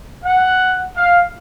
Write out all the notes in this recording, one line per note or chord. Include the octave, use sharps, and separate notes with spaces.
F#5
F5